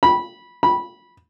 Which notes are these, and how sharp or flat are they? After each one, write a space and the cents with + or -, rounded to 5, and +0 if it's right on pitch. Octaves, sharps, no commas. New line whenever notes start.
B5 -15
B5 -15